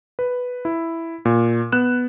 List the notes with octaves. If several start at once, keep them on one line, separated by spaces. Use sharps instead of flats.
B4
E4
A#2
B3 F#6 E7